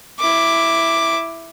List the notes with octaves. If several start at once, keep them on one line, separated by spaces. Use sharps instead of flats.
E4 D6